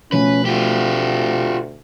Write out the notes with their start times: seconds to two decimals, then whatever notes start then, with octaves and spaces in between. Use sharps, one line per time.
0.12 B2 F3 A3 C#4 B4
0.46 D2 F4 G4